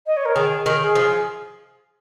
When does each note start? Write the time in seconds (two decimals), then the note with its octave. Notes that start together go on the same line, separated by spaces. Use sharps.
0.06 D#5
0.16 C#5
0.25 A#4
0.35 D#3 G#4
0.66 D#3
0.80 G#4
0.95 F3